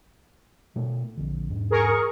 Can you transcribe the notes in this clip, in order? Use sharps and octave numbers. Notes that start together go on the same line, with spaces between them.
B2 A3
A#1 D3
E2 G#2
G#4 A#4 C#6